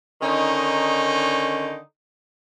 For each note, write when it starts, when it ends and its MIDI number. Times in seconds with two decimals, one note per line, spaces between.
0.22 1.78 50
0.22 1.78 51
0.22 1.78 61
0.22 1.78 63